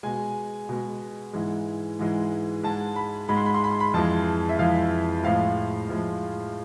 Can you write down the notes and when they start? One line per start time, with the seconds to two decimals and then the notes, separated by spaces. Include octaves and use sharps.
0.03 B2 G#3 G#5
0.69 B2 G#3
1.33 G#2 E3 G#3
1.99 G#2 E3 G#3
2.63 G#2 G#3 A5
2.96 B5
3.28 G#2 G#3 B5
3.37 C6
3.46 B5
3.54 C6
3.64 B5
3.71 C6
3.80 B5
3.94 F2 E3 G#3 A5
4.49 E5
4.59 F2 E3 G#3 F5
5.23 A2 F3 G#3 F5
5.89 A2 F3 G#3